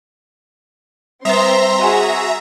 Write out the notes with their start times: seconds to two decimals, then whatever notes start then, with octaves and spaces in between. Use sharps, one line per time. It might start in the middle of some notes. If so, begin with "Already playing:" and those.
1.25 G3 C4 B4 E5 A#5 C6
1.79 F#4 G#4 D#5 F#5 G#5